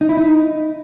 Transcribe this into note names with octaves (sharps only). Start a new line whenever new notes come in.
D#4
E4
D#4